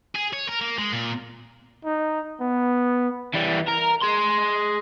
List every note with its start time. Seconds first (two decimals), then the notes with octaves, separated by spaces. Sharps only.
0.15 G#4
0.33 C#5
0.48 A#4
0.61 A#3
0.79 G#3
0.93 A#2
1.85 D#4
2.41 B3
3.34 E3 G3
3.67 A#4
4.02 G#4 C6